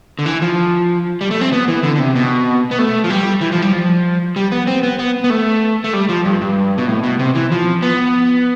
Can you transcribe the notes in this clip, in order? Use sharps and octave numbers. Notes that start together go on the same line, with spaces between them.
D3
E3
F3
G3
A3
C4
B3
E3
D3
D3
C3
B2
B3
A3
F3
G3
E3
F3
G3
F3
G3
B3
C4
B3
B3
B3
A3
A3
G3
F3
G2
G2
B2
A2
B2
C3
E3
F3
B3